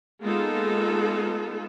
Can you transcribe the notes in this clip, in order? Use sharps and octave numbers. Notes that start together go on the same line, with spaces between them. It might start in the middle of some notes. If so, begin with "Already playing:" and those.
G#3 A#3 B3 D#4 F4 A4